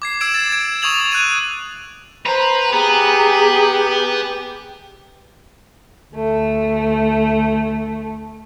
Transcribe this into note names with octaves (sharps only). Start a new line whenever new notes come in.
D6 G#6 C7
D6 E6 G#6 D7 E7
G#6 A6
G#6 D7
C#6 D#6 G#6 F7 F#7
F#6 G#6 D#7
B4 C5 A#5
B3 G4 G#4
D2 A3